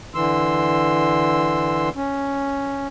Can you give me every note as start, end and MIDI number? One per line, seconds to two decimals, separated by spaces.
0.15 1.89 50
0.15 1.89 52
0.15 1.89 84
0.15 1.89 88
1.96 2.88 61